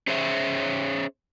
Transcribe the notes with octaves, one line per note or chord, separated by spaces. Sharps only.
C#4 G#4 C5 C#5 E5